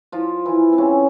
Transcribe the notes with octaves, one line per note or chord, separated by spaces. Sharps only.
F3 F4
E3 E4
C4
C#3 C#4